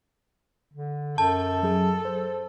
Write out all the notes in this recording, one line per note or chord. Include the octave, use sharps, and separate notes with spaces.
D3
F#2 A4 A5
F#3 G#4
C5